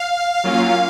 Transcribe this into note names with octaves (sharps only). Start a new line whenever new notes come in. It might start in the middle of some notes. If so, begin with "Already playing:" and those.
Already playing: F5
F#3 A#3 C#4 F4